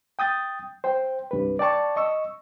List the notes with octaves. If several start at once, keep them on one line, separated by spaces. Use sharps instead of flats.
G5 D#6 G6 A6
C5 G5
C2 G2 B4
D5 G5 A5 C#6
D#5 C#6 E6